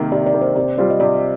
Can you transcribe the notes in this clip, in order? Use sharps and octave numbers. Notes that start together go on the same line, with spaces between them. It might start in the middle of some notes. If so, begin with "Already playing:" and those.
Already playing: C3 D#3 A#3
C3 D5
D5
D#3 A#3
C5
C3 D5
G3 C4 F4 D5
D#5
C3 D5